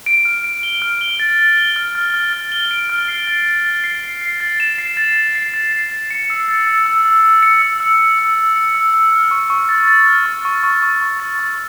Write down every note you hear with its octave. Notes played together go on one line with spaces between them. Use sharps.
D7
F6
D7
G7
F6
G7
A6
A6
G7
F6
F6
F6
A6
G7
D7
F6
C7
A6
A6
A6
C7
C7
C7
A6
E7
C7
A6
A6
C7
A6
C7
A6
C#7
E6
A6
E6
E6
E6
E6
C#7
E6
E6
E6
E6
E6
C#7
E6
E6
F6
C#6
C#6
A6
A6
F6
C#6
C#6
C#6
C#6
C#6
A6
C#6